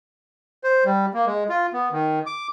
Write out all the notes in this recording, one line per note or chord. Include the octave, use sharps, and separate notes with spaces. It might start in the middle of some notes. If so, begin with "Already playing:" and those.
C5
G3
A#3
G#3
F4
B3
D#3
D6